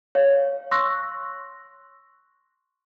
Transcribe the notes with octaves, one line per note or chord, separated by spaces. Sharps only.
C#5 F5
C6 C#6 E6 F#6 A#6